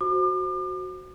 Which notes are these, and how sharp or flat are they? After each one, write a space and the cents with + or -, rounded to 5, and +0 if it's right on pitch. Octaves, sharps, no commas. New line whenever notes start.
F#4 +0 C5 +0 D6 +40